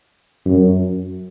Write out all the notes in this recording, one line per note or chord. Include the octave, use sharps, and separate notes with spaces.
F#2